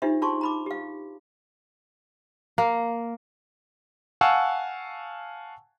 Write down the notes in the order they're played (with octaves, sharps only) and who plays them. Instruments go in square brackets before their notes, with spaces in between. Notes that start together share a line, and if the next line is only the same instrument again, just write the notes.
[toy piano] D4 D#4 F4 G4 C5 E5
D4 F4 G#4 A5 C6 C#6
A#5 B5 D6
G4 F5
[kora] A#3
[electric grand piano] F5 F#5 G#5 A5 C#6 E6